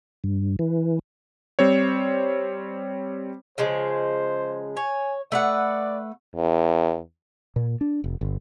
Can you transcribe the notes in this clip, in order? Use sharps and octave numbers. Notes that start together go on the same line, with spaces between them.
G2
E3
G3 C4 C5 C#5
C#3 F3 G#3 C5
C#5 G#5
A3 B4 D5 F#5
E2
A#2
D4
F1
G1